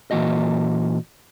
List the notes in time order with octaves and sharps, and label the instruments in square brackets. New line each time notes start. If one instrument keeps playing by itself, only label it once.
[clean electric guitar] A#2 E3 A#3 F#4 D#5